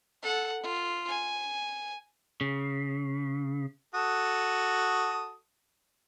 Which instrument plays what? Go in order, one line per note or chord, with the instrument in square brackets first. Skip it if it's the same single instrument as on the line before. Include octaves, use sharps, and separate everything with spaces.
[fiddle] A4 F#5
F4
G#5
[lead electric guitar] C#3
[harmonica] F#4 A4 D#6